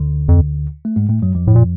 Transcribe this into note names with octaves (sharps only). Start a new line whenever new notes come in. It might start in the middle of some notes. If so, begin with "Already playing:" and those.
Already playing: D2 D3
F2
A3
G#2 G#3
A2 A3
F#2 F#3
F2 F3
A2
A#2